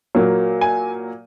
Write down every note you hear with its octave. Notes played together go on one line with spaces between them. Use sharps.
A#2 F#3 A#3
G#5